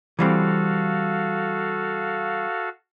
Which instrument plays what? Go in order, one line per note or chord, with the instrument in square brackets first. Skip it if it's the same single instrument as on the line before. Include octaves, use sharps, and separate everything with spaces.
[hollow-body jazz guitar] E3 G3 C4 [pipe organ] F#4 A4 F5